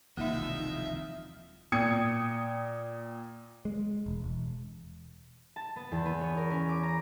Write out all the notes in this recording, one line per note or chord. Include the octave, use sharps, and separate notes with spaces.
E1 C2 D#3 F3 A#3 D#4 E5
A#2 G5 D#6 G#6 C#7
G#3
E1
E1
A5
B3
E2
B3
C#5
A#4
C#4
D6
A#5